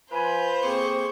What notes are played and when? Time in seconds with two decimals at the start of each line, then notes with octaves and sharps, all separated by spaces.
0.12 F3 F4 B4 C5 G#5
0.62 F2 A#3 C4 G#4 C#6